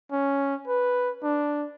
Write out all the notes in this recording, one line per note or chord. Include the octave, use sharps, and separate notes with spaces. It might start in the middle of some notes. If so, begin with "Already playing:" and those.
C#4
B4
D4